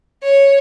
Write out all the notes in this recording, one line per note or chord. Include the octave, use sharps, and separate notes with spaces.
C#5